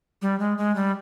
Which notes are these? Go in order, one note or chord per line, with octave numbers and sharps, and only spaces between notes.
G3
G#3
G#3
G3